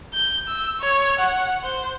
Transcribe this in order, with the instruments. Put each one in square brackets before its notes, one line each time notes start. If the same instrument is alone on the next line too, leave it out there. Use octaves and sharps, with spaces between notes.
[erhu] G6
E6
C#5
F#5
C5